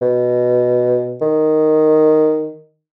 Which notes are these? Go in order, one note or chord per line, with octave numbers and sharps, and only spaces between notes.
B2
D#3